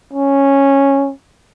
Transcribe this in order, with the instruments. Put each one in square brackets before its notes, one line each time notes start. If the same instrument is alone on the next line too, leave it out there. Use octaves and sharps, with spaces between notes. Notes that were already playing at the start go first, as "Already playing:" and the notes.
[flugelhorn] C#4